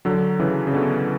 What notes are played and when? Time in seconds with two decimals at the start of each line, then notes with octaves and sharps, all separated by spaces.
0.05 D3 F#3
0.39 C#3 E3
0.67 C#3
0.74 B2 D3